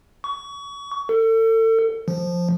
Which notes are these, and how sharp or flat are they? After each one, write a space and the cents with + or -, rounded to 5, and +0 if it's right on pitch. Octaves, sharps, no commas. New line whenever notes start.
C#6 +30
A4 +35
F3 +5